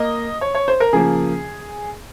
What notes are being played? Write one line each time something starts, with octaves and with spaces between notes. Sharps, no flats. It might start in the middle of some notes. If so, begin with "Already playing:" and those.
Already playing: A#3 D#5
C#5
C#5
C5
A#4
C#3 F3 A#3 G#4